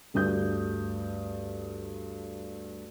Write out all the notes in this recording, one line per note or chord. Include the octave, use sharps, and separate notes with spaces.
D2 G2 D#6 G6